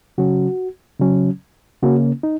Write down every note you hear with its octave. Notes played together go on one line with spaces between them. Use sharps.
C#3 F#3 C#4 F#4
C#3 F#3 C#4
C#3 A#3 C#4 F#4
D#4